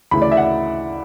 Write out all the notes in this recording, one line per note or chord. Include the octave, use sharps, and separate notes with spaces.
D2 C#3 E3 B5
D5
E5
F#5
E5